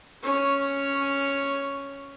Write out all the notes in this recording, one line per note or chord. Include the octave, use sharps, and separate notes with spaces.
C#4 C#5